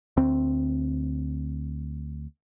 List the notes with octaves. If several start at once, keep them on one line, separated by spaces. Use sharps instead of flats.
D2 C4